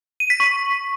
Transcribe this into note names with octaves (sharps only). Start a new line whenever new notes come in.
D#7
B6
C#6